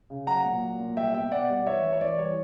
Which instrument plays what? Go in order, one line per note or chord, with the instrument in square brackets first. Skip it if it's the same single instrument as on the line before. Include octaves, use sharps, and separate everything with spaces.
[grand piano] C#3
F#3 F#5 A#5
A#2
F#3
A#2
G3 E5 G5
B2 E5 G5
B2 D5 F#5
G3 D5 F#5
E3 C#5 E5
E3
C#5
E3 D5
G3 C#5